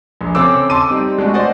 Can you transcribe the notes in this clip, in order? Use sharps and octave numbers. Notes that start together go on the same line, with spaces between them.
A#1 G#4
C#3 C4 A4 D6 E6
A5 C6 D6 D#7
G3 C4 D#4
G#3 A3 D4 F#4
F#4 C5 D5 D#5 F#5